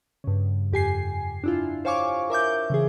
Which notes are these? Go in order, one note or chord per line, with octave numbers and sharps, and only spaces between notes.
G2 C#3
F2 G4 G#5 C7
D4 E4 F4
C5 C#5 F5 G#5 C#6 D6
A#4 E5 D6 G6
C#3 E3 G#4